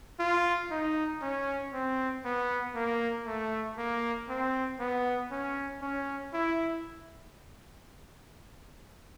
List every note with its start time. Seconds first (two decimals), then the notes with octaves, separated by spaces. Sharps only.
0.20 F4
0.71 D#4
1.22 C#4
1.73 C4
2.25 B3
2.75 A#3
3.26 A3
3.77 A#3
4.29 C4
4.80 B3
5.31 C#4
5.82 C#4
6.34 E4